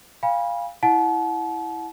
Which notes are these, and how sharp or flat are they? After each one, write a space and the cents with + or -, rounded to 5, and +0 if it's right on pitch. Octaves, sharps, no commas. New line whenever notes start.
F5 +0 G#5 -40 B5 -25
E4 +0 F#5 -20 A5 -40